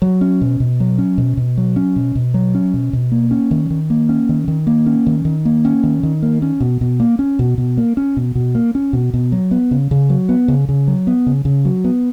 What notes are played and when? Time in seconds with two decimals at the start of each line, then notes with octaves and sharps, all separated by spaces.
0.02 F#3
0.21 C#4
0.41 B2
0.60 B2
0.80 F#3
0.98 C#4
1.18 B2
1.37 B2
1.57 F#3
1.76 C#4
1.96 B2
2.15 B2
2.34 F#3
2.55 C#4
2.74 B2
2.93 B2
3.12 A#3
3.31 C#4
3.51 D#3
3.70 D#3
3.90 A#3
4.09 C#4
4.29 D#3
4.48 D#3
4.67 A#3
4.86 C#4
5.07 D#3
5.25 D#3
5.45 A#3
5.65 C#4
5.83 D#3
6.03 D#3
6.23 A#3
6.42 C#4
6.60 B2
6.81 B2
7.00 A#3
7.19 C#4
7.39 B2
7.58 B2
7.77 A#3
7.97 C#4
8.17 B2
8.35 B2
8.55 A#3
8.75 C#4
8.93 B2
9.14 B2
9.32 F#3
9.51 B3
9.71 C#3
9.91 C#3
10.10 F#3
10.29 B3
10.48 C#3
10.69 C#3
10.88 F#3
11.07 B3
11.26 C#3
11.45 C#3
11.65 F#3
11.84 B3